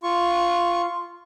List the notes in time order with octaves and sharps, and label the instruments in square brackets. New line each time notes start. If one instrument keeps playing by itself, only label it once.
[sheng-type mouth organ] F4 C#6 [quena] C6